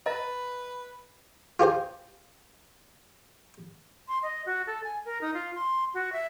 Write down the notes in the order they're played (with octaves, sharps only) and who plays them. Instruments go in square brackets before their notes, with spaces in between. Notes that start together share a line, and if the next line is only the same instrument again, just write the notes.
[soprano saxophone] B4 [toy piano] D#5 A#5
[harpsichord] F4 G4 G#4 C5
[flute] C6
D#5
F#4
A4
G#5
A#4
D#4
F4
C6
F#4
E5